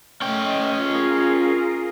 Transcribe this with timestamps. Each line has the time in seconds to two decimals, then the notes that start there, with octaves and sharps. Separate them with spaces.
0.22 A3 C#4 D#5 G5
0.85 F4 G#4 A#4